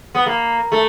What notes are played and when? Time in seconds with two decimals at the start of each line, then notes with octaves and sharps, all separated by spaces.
0.15 B3
0.26 A#3
0.72 A3